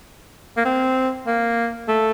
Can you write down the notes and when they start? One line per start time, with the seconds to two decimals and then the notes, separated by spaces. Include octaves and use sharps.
0.57 A#3
0.65 C4
1.27 A#3
1.88 A3